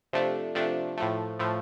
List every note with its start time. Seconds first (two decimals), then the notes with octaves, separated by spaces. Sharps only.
0.13 C3 F3 A3 D4
0.55 C3 F3 A3 D4
0.98 A2 F3 A3
1.40 A2 F3 A3